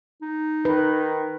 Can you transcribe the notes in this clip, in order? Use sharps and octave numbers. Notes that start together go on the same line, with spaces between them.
D#4
D#3 B4